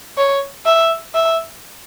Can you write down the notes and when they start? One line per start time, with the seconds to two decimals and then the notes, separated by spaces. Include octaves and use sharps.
0.17 C#5
0.66 E5
1.14 E5